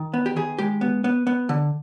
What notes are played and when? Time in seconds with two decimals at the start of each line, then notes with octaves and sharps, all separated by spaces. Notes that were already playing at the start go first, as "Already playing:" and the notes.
Already playing: D#3
0.14 B3
0.26 G4
0.36 D#3 G#4
0.59 G#3 G4
0.81 B3
1.04 B3
1.27 B3
1.49 D3